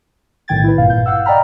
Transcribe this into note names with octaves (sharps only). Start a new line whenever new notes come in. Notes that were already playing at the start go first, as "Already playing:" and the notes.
B1 A2 D#3 G5 G#6 A6
E4 B4
G#1 G2 A#2 F5
G6
F5 F#5 E6
D5 D#5 G5 A#5 B5 F6